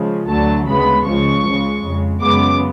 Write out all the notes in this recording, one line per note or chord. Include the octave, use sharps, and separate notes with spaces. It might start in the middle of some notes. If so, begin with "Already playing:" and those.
Already playing: C#3 F3 G#3
D2 D3 F#3 A3 A5
D2 C#3 G#3 B3 B5
C#2 C#3 F3 G#3 C#6
C#2 C#3 G#3
F2 C#3 G#3
F#2 C#3 G#3 B3 D6